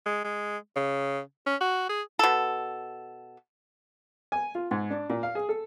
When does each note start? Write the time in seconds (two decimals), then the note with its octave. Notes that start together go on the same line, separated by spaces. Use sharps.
0.06 G#3
0.24 G#3
0.76 C#3
1.46 C#4
1.61 F#4
1.89 G#4
2.19 B2 A4
4.32 G#5
4.55 F4
4.71 G#2
4.90 D4
5.10 A#2
5.23 F5
5.35 G#4
5.49 A4